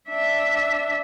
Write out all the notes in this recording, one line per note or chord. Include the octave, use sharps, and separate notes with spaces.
D4 E5